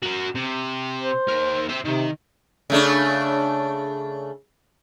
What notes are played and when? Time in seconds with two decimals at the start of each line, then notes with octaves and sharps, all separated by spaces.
0.03 F#4 A#4
0.35 C3
1.00 C5
1.28 D#2 A#4
1.69 C5 E5
1.85 C3 D#3
2.70 C#3 A3 D4